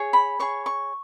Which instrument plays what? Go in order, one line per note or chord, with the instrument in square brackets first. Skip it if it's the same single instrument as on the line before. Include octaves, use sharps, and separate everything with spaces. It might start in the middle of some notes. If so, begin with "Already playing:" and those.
Already playing: [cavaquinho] G#4 C#5
B5
G#4 C#5 C#6
C#6